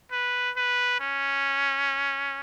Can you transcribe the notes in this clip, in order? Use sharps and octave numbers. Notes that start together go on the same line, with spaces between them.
B4
B4
C#4